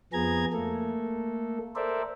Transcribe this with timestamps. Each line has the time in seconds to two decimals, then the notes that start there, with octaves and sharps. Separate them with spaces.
0.13 F2 F3 B3 G#4 A#5 G#6
0.53 A3 A#3 A4
1.76 A4 A#4 C5 D5 E5